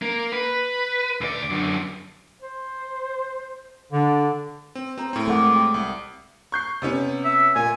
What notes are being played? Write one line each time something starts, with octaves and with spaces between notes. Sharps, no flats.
A#3
B4
D2 D5
F#2 D3
C5
D3 D4
C4
C4 G#4 C5 A#5
A2 C4
G#3 A3 A4 A#4 D5 D#5 F#5 D6
G4
C2
C#6 G6 C7
C3 B3 C#4
E5
A#2 G#5